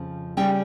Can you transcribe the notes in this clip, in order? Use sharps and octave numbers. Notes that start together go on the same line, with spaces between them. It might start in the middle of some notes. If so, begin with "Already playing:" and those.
Already playing: F2 C#3 F3
C#3 G3 C#4 G5